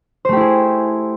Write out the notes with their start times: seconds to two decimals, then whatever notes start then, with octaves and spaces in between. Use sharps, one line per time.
0.25 C5
0.29 A3
0.33 G4
0.37 E4
0.41 G#4